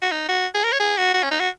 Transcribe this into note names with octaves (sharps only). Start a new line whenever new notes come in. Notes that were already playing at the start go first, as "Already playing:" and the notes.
F#4
D#4
F#4
G#4
A#4
C#5
G#4
F#4
F#4
C#4
D#4
F#4